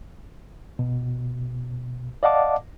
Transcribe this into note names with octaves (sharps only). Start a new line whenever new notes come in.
B2
D5 D#5 F5 F#5 A5 D6